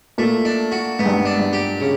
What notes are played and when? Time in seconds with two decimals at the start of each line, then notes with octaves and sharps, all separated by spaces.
0.18 A#2 A3
0.45 D4
0.72 F#4
0.99 G#2 B3
1.06 G2
1.14 G#2
1.25 D4
1.39 G2
1.53 G4
1.80 C#3